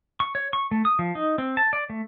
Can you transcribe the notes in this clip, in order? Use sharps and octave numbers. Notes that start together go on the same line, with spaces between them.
C#6
C#5
C#6
A3
D#6
F3
D#4
C4
A5
D5
A3